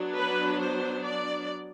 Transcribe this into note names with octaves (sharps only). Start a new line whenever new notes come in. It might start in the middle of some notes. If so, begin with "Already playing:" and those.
Already playing: F#3 B3 D4
B4
C5
D5